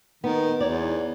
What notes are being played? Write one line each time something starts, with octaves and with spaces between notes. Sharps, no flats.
D#3 B3
E2 C#5 D5